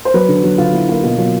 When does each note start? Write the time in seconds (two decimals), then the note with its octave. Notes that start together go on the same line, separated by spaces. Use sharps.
0.05 C5
0.14 F#3 B4
0.29 D3
0.44 F#3
0.58 D3 F4
0.73 F#3 E4
0.89 A#3 F4
1.04 B2 F4
1.18 F#3 F4